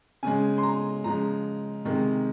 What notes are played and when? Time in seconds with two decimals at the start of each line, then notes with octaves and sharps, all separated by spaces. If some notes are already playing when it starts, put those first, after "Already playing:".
0.23 C#3 G#3 G#5
0.58 C6
0.63 A#5
1.04 C#3 F3 G#3 A#5
1.85 C3 D#3 G#3